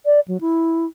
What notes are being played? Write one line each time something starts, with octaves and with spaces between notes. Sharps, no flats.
D5
F#3
E4